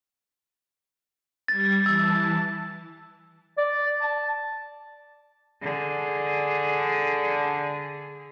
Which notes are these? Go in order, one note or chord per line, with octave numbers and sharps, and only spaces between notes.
G3 G#6 A6
E3 A5 E6
D5
A5
D3 G#4